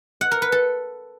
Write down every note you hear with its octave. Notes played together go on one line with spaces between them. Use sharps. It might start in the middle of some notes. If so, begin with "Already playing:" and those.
F#5
A#4
B4
A4